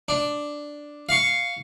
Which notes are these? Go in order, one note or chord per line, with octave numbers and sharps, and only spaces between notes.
D4
F5 C#6